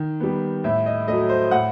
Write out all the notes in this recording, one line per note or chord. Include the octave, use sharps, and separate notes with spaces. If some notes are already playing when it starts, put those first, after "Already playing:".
Already playing: D#3
G3 B3
A2 E5
D#5
F#3 A3 D#5
C5
A2 F#5